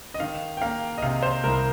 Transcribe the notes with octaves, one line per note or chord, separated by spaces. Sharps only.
D#5
D#3 F5
G5
A#3 F5
D#5
C3 F5
C5
C2 A#4